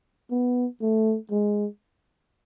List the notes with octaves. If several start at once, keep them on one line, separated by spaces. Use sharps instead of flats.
B3
A3
G#3